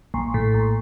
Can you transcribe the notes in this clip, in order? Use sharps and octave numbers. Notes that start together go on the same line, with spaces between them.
A#1
A2
A#1